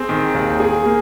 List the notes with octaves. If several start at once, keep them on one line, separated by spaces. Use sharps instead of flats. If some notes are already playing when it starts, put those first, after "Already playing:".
Already playing: C4 G#4
D#3
D#2
G#4
A#3